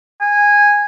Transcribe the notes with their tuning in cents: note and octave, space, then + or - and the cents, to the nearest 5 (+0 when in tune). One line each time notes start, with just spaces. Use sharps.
G#5 -10